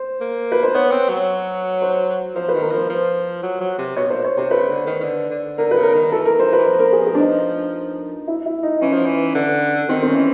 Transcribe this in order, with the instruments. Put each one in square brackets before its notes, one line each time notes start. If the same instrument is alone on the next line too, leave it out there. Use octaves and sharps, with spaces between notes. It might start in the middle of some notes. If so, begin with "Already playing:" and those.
Already playing: [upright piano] C5
[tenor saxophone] A#3
[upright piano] B4
C5
[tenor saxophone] B3 [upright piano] C#5
[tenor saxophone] C4
F#3
[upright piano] C5
[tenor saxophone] F3 [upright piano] C5
[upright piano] B4
[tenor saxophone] D#3
[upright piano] A#4
[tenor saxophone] F3 [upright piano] C5
[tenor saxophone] F3
F#3
F#3
C3
[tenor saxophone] B2 [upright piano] C#5
[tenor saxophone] A#2 [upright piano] C5
[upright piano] C#5
[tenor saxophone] C3 [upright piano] C5
[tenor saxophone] C#3 [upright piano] B4
[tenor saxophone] D3
D#3
D#3
D3
D3
[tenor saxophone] D3 [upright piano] A#4
[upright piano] B4
[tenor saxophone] C#3
[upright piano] A#4
[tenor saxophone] D#3
[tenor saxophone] E3 [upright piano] A4
[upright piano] A#4
C5
B4
[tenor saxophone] E3
[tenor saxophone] F3 [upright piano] C5
[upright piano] A#4
G#4
G#4
D4
D#4
E4
E4
D#4
[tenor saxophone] E3 [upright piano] C#4
[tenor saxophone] F3
E3
D3
[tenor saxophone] D#3 [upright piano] C4
[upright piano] C4
C#4
[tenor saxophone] E3